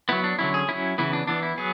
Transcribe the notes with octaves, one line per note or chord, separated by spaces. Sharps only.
F#3 B3 E4
D4
D3 F#3 C#4 E4
G#4
F#3 C#4 E4
C#3 E3 B3 E4
D4
E3 B3 D4
E4
F#3 B3 G#4